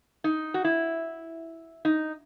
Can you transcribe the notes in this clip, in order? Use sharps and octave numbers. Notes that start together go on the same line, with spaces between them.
D#4
F#4
E4
D#4